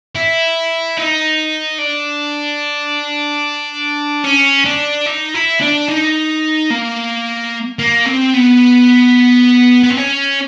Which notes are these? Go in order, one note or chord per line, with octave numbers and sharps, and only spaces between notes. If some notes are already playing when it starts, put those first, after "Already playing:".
E4
D#4
D4
C#4
D4
D#4
E4
D4
D#4
A#3
A#3
C4
B3
B3
C4
C#4